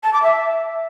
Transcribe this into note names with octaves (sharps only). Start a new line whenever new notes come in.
A5
D6
E5